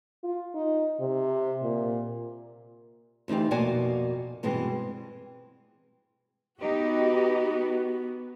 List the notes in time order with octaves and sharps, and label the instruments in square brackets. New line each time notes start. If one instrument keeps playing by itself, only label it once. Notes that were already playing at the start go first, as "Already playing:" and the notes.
[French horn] F4
D#4
C3
A#2
[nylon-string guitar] D2 E3 D#4 F4 G4
F2 B2 A#3 F#4 D5 G#5
G2 B2 E3 G#3 C4
[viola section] B3 F#4 [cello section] D#4 G4